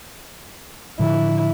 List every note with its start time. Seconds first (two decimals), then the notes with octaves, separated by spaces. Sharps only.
0.99 A2 D3 F3 E4